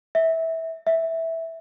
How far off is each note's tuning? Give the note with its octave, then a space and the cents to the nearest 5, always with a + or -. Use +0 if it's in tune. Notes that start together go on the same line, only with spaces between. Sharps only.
E5 -20
E5 -10